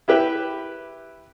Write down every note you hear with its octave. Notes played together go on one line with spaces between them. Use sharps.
E4 G4 B4 E5 G5